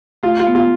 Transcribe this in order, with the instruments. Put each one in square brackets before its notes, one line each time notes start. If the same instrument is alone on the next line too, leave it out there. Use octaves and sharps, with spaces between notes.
[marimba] A3 [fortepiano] F4
[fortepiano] F4
[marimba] B3
[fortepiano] F4